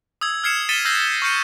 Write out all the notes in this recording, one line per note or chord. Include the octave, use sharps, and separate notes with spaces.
D#6 E6 G#6
F6 G#6 C7 C#7 E7
A6 B6 C#7 D#7 E7 G7
E6 G6 A#6 C7
C#6 F6 G6 C#7 D#7